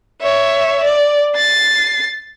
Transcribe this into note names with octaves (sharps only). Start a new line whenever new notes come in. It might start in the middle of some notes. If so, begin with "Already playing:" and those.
C#5 E5
D5
A6 C7